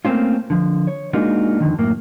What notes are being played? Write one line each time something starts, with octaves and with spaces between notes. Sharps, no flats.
A3 A#3 C4 C#4 F4
D3 F3
C#5
G#3 A#3 D4 D#4 F4 F#4
F2 D3 D#3
F#2 A2 A#3